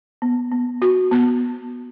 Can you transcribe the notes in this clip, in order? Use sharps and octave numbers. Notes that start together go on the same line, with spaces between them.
B3
B3
F#4
B3